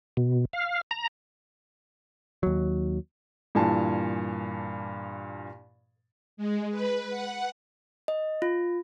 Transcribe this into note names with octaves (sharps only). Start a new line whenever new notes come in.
B2
F5
A#5
D#2 F#3
G2 A#2 E3 G#5 A5
G#3
B4
F#5
D#5
F4